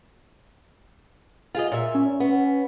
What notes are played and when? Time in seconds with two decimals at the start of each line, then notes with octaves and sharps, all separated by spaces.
1.55 F4 G#4 D#5
1.72 A#2 E5
1.95 C#4
2.20 B3